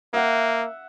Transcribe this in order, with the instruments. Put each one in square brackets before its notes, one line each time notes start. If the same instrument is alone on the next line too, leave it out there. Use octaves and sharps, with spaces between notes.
[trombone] A#3 [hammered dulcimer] E5 F#5